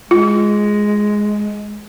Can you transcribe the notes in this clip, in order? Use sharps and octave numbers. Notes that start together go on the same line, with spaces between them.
G#3 F4